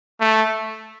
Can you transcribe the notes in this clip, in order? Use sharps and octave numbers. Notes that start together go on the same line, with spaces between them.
A3